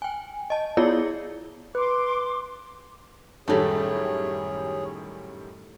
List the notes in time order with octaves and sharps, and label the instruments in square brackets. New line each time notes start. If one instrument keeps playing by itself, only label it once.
[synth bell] G5 G#5
D#5 A5
B3 E4 F4 G#4 C#5 D5
[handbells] B4 [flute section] C6 D6
[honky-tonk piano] F#2 D#3 G3 [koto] A2 A3 [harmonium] G#4 C#5